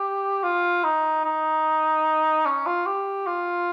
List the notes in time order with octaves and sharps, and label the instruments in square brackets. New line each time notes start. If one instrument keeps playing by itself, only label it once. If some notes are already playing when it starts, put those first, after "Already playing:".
Already playing: [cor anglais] G4
F4
D#4
D#4
C#4
F4
G4
F4